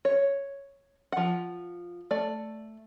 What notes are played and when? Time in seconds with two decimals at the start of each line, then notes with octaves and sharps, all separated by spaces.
0.05 C#5
1.12 F3 F#5
2.11 A3 D5